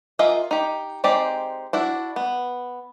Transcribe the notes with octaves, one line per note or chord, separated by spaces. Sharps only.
F4 G#4 A#4 D#5 E5
D#4 G4
G#3 C4 D#4 G4 D5
D4 E4 F#4
B3